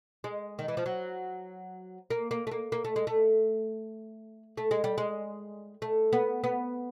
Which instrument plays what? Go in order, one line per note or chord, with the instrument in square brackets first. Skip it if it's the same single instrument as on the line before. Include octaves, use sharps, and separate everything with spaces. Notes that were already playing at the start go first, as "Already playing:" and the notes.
[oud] G#3
D#3
E3
F3
F#3
A#3
A#3
A3
A#3
A#3
A3
G#3
A3
A3
G#3
G3
G#3
A3
B3
B3